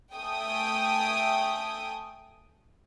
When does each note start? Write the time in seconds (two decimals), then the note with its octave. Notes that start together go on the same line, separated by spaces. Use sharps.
0.15 A3 G5 G#5 D#6